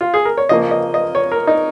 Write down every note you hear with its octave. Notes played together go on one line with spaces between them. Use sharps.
F4
G#4
A#4
C#5
C#3 F3 A#3 D#5
D#5
D#5
C#5
A#4
D#4